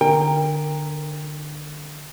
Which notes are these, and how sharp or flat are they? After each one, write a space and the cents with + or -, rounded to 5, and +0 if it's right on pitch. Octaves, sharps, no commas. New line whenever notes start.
D3 +25 A#4 +0 G5 +25